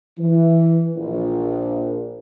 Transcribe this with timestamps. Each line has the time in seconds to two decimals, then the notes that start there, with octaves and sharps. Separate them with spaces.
0.18 E3
0.96 A#1